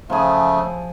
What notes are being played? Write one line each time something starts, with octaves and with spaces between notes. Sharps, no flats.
C#3 F3 A3 G#4